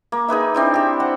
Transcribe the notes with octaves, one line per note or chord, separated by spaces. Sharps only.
A#3
D#4 G#4 B4 E5
C4 D4 E4
G4 E5
C5 F#5